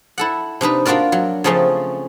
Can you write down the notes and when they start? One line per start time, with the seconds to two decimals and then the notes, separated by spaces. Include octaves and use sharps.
0.18 E4 A4 F#5
0.61 C3 D4 D#4 B4
0.85 A#3 D4 F4 F#4 A#4 D5
1.12 F#3
1.44 C#3 F3 A3 C4 C#4